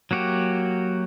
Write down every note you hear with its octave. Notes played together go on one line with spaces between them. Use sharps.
F#3 A#3 F#4 G4